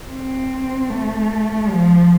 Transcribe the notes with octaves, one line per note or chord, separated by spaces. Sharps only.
C4
A3
F3